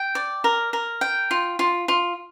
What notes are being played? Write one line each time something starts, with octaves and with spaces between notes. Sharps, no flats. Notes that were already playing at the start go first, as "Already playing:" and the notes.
Already playing: G5
D5
A#4
A#4
G5
F4
F4
F4